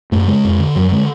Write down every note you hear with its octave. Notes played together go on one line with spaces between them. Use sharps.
F#2 A3
C#3 G#3
F2
D3
F#2 F#3
D3 G#3